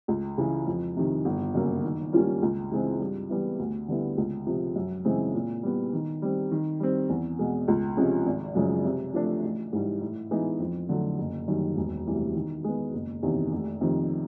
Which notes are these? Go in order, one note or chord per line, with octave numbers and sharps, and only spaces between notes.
C#2
C#3 E3
F2
C3 D#3
G1
F#2 C#3 F#3 A#3
D#3
G3 A#3 C#4 F4
C#2
C#3 E3 G#3 C4
G2
E3 G3 B3 E4
D2
D3 G3 B3 E4
C#2
C3 F3
F#2
C#3 E3 G#3 C4
A#2
G3 B3
D#3
G3 C4
D#3
G3 C4
E2
B2 G#3
C#2
C3 F3 G#3 C#4
G#1
F#2 C#3 F3 G#3
C3
F3 A3 D4
A1
G#2 E3 G3
A2
E3 G#3 B3 D#4
F2
D3 F#3 A3
F#1
F#2 D#3 G3
E1
D2 C3 E3 G3
D#3
G#3 B3
F#1
E2 C3 D#3
F1
F2 C3 D#3